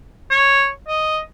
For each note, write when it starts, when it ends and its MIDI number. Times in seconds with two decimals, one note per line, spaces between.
0.31 0.68 73
0.88 1.19 75